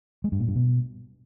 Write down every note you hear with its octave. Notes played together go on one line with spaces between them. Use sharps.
G#3
G2
A#2
G2
B2